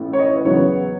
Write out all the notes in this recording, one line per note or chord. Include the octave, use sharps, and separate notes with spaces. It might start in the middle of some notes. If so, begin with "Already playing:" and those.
Already playing: A1 A2 E3 A3
C#5
D#5
B4
E2 C#3 F#3 B3 C#5